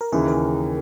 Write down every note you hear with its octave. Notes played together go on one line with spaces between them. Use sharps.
A#4
D#2 C#3 E3 G#4
A#4